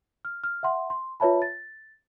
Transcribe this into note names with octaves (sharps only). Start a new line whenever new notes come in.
F6
F6
E5 F#5 C6
C6
F4 B4 C#5 E5 A5 B5
A6